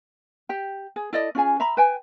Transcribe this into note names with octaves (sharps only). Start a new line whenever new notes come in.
G4 G5
G#4
E4 A4 D5 D#5
C#4 F4 G#4 G#5
E5 A#5 B5
B4 G5 G#5